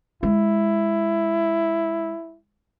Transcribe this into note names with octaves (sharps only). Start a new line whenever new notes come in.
G#3 E4